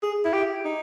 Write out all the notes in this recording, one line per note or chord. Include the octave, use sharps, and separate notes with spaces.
G#4
E4
G4
D#4